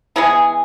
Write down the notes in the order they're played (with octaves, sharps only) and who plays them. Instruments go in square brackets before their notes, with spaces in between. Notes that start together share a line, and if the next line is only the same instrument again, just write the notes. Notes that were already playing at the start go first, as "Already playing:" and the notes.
[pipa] E3 G#3 B3 G#4